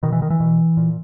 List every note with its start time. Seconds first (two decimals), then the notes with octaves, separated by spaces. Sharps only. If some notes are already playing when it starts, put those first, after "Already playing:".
0.03 B2 D#3
0.12 E3
0.22 D#3
0.30 E3
0.40 B2
0.77 A#2